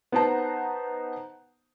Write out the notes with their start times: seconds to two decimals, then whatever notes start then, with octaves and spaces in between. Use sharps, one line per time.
0.12 B3 D#4 C5 F#5 A5 A#5